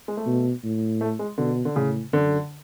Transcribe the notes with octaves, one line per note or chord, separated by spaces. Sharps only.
G#3
A3
B2
A2
A3
G#3
B2 D3
D3
A2 C#3
F#2 D3